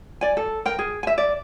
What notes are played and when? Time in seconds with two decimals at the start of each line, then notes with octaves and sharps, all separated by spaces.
0.21 D5 G#5
0.37 A4
0.65 A#4 G5
0.79 G#4
1.03 E5 G#5
1.18 D5